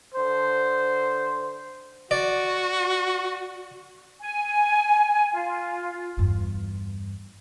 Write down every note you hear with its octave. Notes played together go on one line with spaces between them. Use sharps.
D3 C5
F#4 D5
G#5
F4
E2 G2